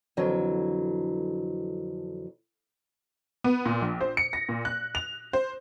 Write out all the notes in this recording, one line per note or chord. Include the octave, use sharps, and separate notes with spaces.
F2 D3 E3 F#3
B3
A#2
A#1
C5
C#7
A#6
A#2
F#6
F7
C5